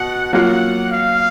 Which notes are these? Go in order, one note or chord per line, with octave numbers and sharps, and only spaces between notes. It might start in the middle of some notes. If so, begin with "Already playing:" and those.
Already playing: B2 F#5
F#3 A#3 F4 F#5
F5